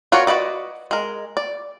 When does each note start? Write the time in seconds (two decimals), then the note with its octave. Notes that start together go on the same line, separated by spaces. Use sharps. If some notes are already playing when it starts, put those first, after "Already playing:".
0.12 F4 F#4 A#4 C#5 D5
0.27 F#4 B4 D5 D#5
0.91 G#3 A#4
1.37 D5